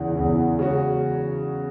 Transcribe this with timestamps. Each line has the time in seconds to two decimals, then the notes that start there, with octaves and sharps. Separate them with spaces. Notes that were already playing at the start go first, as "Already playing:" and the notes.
Already playing: E2 C#3 E3
0.16 E2 C#3 E3
0.59 C#3 G#3 C#4 F#4